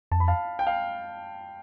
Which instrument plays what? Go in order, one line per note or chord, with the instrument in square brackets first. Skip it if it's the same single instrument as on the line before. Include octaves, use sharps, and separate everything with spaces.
[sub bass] F2 [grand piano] A5
[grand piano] B5
F5 A5
G5
F5